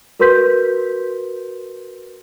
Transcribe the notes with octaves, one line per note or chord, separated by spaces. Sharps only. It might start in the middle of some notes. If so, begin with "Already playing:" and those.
F#4 A#4 B4 C6 G6 B6